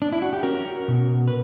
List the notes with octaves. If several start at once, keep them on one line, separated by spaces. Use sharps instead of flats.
D4
E4
F#4
G4
C#4 F#4 A#4
B2
B4